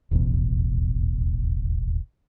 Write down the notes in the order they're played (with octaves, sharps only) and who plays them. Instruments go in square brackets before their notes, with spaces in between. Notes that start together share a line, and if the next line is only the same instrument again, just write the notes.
[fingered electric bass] D#1 A1 E2 B2